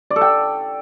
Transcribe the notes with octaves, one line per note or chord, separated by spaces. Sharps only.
D5
A4
G5